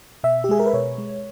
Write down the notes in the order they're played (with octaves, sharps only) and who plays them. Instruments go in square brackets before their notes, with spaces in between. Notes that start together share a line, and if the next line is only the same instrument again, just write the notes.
[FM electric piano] B2 E5
G4
G#3 G#4
A#4
B4
B2 C#5
G#3